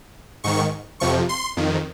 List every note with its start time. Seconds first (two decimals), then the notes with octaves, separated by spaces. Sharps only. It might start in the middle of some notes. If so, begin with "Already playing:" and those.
0.44 G#2 D#3 C#6
1.00 F2 C3 F3 C#6
1.29 C6
1.57 F2 D#3